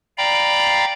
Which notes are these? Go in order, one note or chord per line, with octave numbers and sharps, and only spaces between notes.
D5 F5 G5 A#5 B5